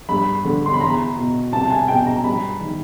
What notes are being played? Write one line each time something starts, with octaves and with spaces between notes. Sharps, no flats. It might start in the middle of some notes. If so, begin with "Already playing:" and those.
G2 B5
D3
C6
B5
E2 A#5
B2
C2 A5
G#5
B2 G5
A#5
G2 B5
D#3